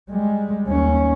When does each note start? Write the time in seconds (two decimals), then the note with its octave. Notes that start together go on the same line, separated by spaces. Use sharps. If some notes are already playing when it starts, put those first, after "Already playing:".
0.10 G3 G#3
0.68 D#2 C#4